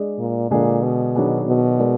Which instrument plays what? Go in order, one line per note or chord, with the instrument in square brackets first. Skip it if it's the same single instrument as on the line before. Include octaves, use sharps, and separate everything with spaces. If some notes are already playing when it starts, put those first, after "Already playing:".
Already playing: [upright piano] G#3 D4 G#4 D5
[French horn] A#2
[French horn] A#2 [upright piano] D3 G#3 D4 G#4
[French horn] B2
[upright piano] D#3 F#3 B3 D4 G#4
[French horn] B2
[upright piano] G#3 D#4 A#4 D5